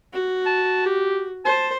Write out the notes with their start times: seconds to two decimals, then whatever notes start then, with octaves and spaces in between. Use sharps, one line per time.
0.13 F#4
0.46 A5
0.86 G4
1.45 C5 A5